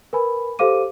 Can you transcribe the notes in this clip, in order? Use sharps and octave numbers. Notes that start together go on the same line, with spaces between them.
A#4 B4 G#5 B5
G4 A4 C5 F5 D6 D#7